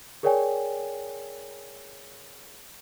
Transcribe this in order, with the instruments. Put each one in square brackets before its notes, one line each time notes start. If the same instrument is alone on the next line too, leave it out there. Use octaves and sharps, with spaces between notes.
[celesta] G#4 A#4 C#5 D5 G5 G#5